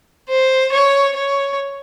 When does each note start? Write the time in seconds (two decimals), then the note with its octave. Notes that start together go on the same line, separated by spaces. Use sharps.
0.29 C5
0.72 C#5
1.16 C#5